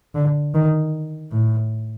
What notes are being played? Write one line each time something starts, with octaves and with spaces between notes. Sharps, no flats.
D3
D#3
A2